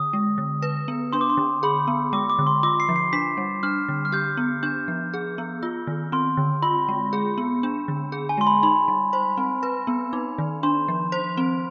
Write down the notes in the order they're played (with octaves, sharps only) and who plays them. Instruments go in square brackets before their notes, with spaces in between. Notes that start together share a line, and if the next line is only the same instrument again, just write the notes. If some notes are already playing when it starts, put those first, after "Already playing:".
Already playing: [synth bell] D3 [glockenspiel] D#6
[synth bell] G#3
D3
B4
B3
[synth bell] D4 [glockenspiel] C6
[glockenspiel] D6
C6
[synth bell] D3
[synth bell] G#4 [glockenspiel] B5
[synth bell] B3
[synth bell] G#3 [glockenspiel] D6
[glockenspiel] D6
[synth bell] D3
[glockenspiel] C6
[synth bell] F4 [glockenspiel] D6
[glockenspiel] C7
[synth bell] F3
[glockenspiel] C7
[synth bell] D4 [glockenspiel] B6
[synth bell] G3
[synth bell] D4 [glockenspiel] F6
[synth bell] D3
[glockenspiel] F6
[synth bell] G4 [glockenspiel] G6
[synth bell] B3
[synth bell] D4 [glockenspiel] G6
[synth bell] F3
G#4
B3
F4
D#3
[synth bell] C4 [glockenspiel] C6
[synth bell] D3
[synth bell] F4 [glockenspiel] B5
[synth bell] G#3
G#4
B3
D4
D3
G#4
[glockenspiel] G#5
[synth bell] G#3 [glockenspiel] C6
[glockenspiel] B5
[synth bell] D#4 [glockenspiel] B5
[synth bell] G3
[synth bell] C5 [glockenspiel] B5
[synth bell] C4
B4
B3
D#4
D#3
[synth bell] D4 [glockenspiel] C6
[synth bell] F3
C5
C4